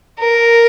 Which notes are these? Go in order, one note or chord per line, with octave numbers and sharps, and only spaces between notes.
A#4